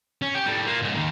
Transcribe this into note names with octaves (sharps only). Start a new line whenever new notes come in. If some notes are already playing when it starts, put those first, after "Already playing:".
C#4
G4
A2 G3
A#3 F4
G#2 C#3
D#2 D#3